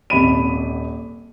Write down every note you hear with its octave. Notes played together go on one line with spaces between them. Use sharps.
D#1 G#1 B5 D#7